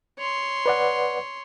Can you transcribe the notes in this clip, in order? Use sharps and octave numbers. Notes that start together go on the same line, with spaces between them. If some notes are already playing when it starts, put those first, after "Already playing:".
C#5 C6
B4 D5 F#5